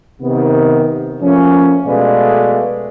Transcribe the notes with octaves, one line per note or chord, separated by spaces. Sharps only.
C3 D#3 B3
F3 A3 A#3 C#4
B2 G#3 A3 B4 D5 F5